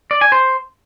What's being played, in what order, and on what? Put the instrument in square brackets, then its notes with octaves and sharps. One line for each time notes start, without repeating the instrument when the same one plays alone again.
[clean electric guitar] D5
G#5
C5